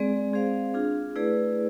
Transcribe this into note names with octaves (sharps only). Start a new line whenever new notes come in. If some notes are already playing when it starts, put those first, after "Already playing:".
Already playing: G#3 C4 G#4 D5
C4 G#4 C5 F5
D4 F4 G#4
A3 E4 G#4 B4 D5